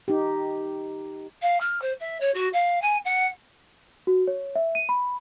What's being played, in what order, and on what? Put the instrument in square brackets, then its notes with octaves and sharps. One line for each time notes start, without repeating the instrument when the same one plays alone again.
[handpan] D#4 G4
[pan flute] F5
F6
C5
E5
C#5
F#4
F5
G#5
F#5
[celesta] F#4
C#5
E5
D#7
B5